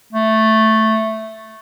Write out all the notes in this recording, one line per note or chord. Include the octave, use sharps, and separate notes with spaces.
A3